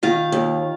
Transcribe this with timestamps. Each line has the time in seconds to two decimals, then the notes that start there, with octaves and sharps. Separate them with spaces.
0.03 D#3 F4
0.32 D#2